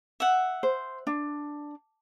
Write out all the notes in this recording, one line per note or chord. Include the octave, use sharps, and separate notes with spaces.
E5 F#5
C5
D4